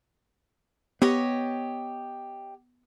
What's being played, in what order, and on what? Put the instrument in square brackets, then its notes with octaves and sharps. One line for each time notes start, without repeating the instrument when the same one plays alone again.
[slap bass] B3 [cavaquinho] G4 C#5 D#5